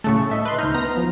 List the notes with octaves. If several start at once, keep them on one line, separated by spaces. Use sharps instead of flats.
A2 C#3 A3 A5 C#6
D#5 E5 A5
B4 C6
C#2 D#4 F6 G6
B3 A#5
F3